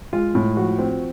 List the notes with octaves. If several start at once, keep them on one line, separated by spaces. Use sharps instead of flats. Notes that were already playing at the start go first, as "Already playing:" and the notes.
G#3 F4
A2
F3 F#4
C4